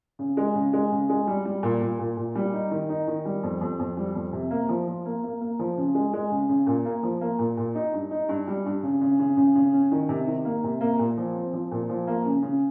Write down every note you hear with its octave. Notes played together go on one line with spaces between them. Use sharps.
C#3
G#3
C#3
G#3
C#3
G#3
G3
G3
A#2
A#2
A#2
A#2
G3
D#4
D#3
D#4
D#3
G3
F2
F2
F2
G3
F2
C3
A#3
F3
F3
A#3
A#3
A#3
F3
C#3
G#3
G#3
C#3
C#3
A#2
A#3
F3
A#3
A#2
A#2
D#4
G2
D#4
G2
G3
G2
C#3
C#3
C#3
C#3
C#3
C#4
D#3
C3
D#3
A#3
C3
A#3
A#2
F3
C4
F3
A#2
F3
A#3
C#3
C#3